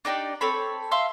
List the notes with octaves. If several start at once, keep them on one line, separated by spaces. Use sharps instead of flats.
D4 D#4 G4 D5
C4 A4 C#5 B5
E5 F5 C6